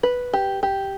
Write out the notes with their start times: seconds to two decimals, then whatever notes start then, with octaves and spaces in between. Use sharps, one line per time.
0.03 B4
0.33 G4
0.63 G4